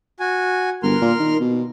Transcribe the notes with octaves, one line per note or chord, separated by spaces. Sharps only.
F#4 G#5
G1 A#4 C6 F6
A#2
D#3
B2